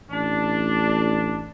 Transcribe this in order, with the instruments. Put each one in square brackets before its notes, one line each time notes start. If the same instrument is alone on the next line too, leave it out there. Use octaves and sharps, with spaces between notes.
[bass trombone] A1 [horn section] D4